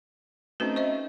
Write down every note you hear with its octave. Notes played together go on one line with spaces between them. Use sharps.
A3 C4 C#4 D#4 F#4 B4
C5 D#5 E5